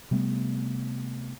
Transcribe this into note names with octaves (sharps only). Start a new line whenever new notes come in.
C3 G3 A3 B3